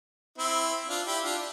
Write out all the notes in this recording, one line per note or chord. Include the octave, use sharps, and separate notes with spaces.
C4 E4
D4 F4
E4 G4
D4 F4